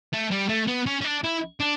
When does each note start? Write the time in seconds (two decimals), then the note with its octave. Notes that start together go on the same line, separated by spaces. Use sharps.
0.13 A3
0.32 G3
0.49 A3
0.68 B3
0.86 C#4
1.01 C#4
1.04 D4
1.24 E4
1.60 D4